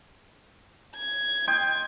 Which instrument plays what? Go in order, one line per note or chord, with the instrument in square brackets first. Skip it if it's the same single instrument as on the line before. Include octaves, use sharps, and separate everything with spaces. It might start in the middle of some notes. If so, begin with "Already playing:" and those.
[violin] G#6
[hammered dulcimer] D#5 G5 C6